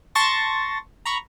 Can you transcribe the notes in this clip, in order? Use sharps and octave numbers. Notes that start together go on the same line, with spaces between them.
A5 C6 C#6 A6 A#6
A#5 B5 C#6